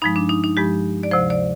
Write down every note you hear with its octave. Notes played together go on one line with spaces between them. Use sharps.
G2 F3 G#3 D#4
D4
D#4
D#4
G2 F3 G#3 G4
D5
D2 C3 F3 C5
D5